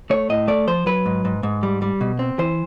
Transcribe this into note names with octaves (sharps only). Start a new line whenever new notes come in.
A3 C#5
A2 D#5
A3 D5
F3 C5
F#3 B4
G#2
G#2
G#2
G3
G3
B2
C4
E3 C5